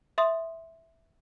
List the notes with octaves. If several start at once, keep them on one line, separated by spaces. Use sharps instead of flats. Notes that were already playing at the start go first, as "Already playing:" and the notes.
E5 C6 D#6